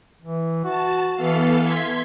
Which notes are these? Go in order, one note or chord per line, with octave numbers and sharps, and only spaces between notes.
E3
F#4 A5
E3 B3 A4 F5
C6 G#6 B6